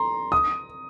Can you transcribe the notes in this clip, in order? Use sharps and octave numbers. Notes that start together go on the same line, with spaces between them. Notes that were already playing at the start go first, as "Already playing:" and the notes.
Already playing: A#5 C6
D#6